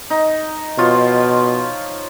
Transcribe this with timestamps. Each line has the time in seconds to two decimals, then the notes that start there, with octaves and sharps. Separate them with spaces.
0.10 D#4
0.78 B2 F3 F4 C#5